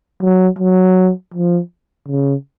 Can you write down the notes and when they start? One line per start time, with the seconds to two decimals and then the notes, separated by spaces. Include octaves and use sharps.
0.22 F#3
0.59 F#3
1.34 F3
2.08 C#3